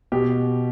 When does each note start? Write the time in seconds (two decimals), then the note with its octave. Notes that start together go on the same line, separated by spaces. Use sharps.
0.12 B2 G4